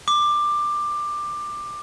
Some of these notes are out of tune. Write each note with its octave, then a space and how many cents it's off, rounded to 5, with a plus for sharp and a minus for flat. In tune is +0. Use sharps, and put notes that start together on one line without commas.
D6 +15